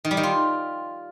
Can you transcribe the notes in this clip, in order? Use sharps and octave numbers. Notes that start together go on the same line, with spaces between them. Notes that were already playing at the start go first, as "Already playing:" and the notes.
D#3
G3
D#3
F4